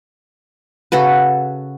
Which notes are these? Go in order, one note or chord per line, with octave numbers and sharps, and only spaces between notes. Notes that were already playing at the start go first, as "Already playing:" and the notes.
C#3 F#4 A4 B4